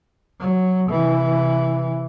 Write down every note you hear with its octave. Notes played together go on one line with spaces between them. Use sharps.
F#3
C3 E3